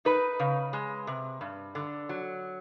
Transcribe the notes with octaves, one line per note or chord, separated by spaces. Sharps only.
D#4 B4
C#3
G#3
C3
G2
D3
F#3